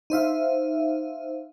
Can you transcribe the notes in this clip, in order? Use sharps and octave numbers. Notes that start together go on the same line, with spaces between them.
D#4 C5 E5 F5